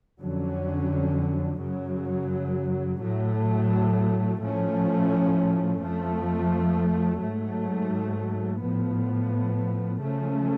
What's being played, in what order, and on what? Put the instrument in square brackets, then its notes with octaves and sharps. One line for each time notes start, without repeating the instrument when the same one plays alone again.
[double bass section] F2 D3 F#3 C#4
F#2 C#3 F#3
A2 F#3 A3
A2 F3 A3 C#4
F2 F3 A3
G#2 F#3 A3
A2 F3 B3
C#3 F3 A3 C#4